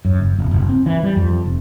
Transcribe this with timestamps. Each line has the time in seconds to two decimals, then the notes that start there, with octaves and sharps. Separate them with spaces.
0.05 F#2
0.20 F#1
0.38 E1
0.51 F#1
0.69 C4
0.86 E3
1.03 G3
1.16 F2
1.45 F1